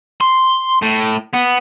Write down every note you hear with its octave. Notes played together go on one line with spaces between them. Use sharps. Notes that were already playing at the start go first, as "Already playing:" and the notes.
C6
A2
B3